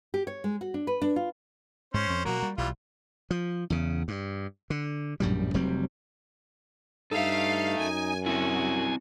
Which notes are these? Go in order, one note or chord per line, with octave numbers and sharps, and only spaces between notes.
G4
C#5
G#3
F#4
D4
B4
D4
F4
G#2 C#4 C5
F2
B2 D3 F#3 A#3 F#4 A#4
G3
B1 E3 G3 F4
F3
E2 C#3
G2
D3
A#1 F#2 A2 G3
F1 F#3 G3 C4
G2 D#4 A4 E5 F5
F#2 G#5
C4 E4 F#4 G#5